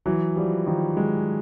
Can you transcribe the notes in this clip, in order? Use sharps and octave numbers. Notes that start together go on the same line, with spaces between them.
E3 F#3
F3 G3
D#3 F3
F#3 G#3